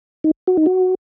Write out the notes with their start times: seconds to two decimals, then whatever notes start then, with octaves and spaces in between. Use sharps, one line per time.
0.24 D#4
0.47 F#4
0.57 D#4
0.66 F#4